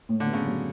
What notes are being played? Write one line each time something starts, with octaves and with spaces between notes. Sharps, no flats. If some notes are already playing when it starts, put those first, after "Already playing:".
A2
D3
B3
C#3
F#3